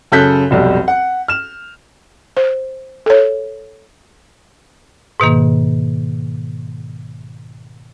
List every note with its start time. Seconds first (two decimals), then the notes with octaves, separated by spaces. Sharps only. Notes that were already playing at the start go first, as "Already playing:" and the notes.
0.12 F#2 C#3 A4 F#6 G6 B6
0.51 F1 B1 G3
0.88 F#5
1.28 F6 E7
2.37 C5
3.06 A4 C#5
5.20 G#2 B2 D#3 A#3